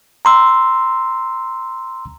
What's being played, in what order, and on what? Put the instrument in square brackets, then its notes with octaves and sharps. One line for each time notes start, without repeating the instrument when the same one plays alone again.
[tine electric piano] A#5 C6 E6